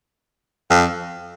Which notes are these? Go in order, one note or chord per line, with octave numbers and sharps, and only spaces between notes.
F2